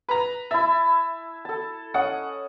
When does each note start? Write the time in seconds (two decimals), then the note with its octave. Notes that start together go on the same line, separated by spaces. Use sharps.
0.09 B4 A#5
0.51 E4 E5 A5
1.45 A4 A5
1.94 C#4 D#5 F#5